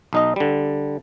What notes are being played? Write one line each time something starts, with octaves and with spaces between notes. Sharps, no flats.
B1 D#4 D#5
D3 G3